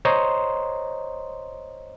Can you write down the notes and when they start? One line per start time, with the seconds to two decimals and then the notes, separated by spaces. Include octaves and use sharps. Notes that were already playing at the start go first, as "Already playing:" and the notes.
0.05 C5 C#5 D#5 A#5 C6